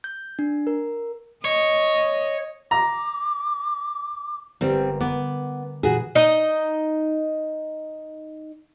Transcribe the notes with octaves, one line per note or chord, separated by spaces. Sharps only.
G6
D4
A#4
C#5 D#5
A#5 D6
G1 G3 C4 A#4
B3 G#5 D6
A#2 E3 F#4 G#4
D#4 D#5